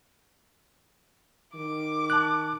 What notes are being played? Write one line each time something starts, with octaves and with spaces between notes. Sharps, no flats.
D#3 D6
A5 F#6